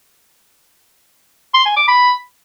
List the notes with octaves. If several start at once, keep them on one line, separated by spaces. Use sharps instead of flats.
C6
G#5
D6
B5